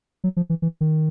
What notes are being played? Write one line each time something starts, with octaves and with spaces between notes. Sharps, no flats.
F#3
F3
E3
E3
D#3